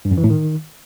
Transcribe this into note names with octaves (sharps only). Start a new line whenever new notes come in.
G2
F#2
E3
A2
D#3